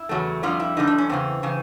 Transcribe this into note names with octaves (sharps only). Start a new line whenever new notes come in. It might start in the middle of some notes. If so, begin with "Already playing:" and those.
Already playing: E4
E2 C#3 F#3 A3
F2 D3 G3 F4
E4
F2 D3 G3 D#4
D4
C#4
E2 C#3 E3 C4
C#3 E3